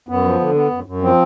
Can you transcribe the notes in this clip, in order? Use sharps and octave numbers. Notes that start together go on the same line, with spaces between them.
F#2 B3
F3
D3
B3
F#2
F#2
F3 C4